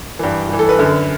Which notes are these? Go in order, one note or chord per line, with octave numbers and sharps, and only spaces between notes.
G2 E3
G2 E3
A4
B4
F#2 D3